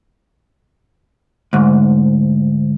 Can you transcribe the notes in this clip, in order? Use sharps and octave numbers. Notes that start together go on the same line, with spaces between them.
D2 G#2